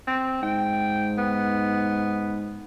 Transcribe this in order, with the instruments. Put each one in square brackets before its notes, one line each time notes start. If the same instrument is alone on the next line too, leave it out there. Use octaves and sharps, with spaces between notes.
[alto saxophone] C4
[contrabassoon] G#2 [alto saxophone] G5
[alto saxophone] B3